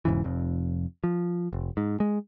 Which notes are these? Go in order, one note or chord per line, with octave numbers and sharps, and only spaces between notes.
E1 G#2 C#3 E3
F1 F2
F3
F1
G#2
G#3